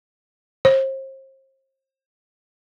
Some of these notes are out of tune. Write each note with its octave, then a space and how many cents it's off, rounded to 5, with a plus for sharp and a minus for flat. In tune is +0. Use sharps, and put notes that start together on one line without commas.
C5 +35